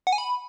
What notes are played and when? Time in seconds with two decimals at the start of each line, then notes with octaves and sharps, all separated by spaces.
0.07 F#5
0.13 G#5
0.18 B5